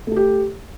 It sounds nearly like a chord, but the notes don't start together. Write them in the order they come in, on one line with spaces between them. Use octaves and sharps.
A3 A4 G4